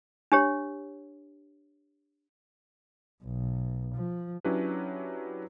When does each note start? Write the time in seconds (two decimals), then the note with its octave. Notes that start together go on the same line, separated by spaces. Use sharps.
0.32 D4 G4 C#5
3.24 B1
3.95 F3
4.45 F#3 C#4 D4 E4 G4 B4